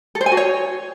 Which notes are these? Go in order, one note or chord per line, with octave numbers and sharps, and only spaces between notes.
A4
C5
G#5
F#4
C#5